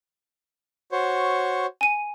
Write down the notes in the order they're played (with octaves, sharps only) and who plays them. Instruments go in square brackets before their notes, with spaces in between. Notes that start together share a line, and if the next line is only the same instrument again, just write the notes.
[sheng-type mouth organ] F#4 C5 C#5
[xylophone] G#5 D#7